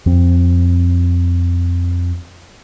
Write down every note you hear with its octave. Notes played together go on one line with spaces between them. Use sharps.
F2 C4